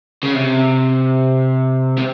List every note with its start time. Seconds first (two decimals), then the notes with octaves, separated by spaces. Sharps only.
0.23 C#3
0.34 C3
1.98 C3